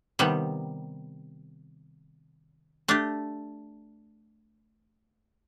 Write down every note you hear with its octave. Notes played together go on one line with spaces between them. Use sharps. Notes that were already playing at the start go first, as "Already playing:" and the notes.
C3 D#3 G3 B3
A3 D4 G4